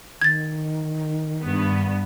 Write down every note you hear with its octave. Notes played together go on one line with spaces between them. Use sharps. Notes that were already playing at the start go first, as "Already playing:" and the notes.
D#3 G#6 A6
G2 B3